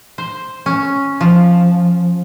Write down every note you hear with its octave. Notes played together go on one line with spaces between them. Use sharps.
C5
C#4
F3